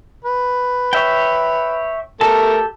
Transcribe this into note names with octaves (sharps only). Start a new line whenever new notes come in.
B4
C#5 E5 G5
A3 G4 A4 A#4 A5